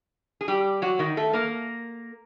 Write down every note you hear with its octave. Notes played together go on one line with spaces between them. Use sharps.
G#4
G3 G4
F#3 F#4
D#3 D#4
A3 A4
A#3 A#4